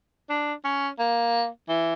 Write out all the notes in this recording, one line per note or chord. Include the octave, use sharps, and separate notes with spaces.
D4
C#4
A#3
E3